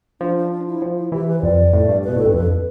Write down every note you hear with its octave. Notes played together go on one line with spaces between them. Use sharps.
F3 D4
D4
D4
E4
F3
E4
E3 G4
B4
C5
F2 D5
A2
G2
B2 B4
A2 A4
G2
F2 B4